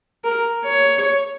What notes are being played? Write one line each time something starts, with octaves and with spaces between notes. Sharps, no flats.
A#4
C#5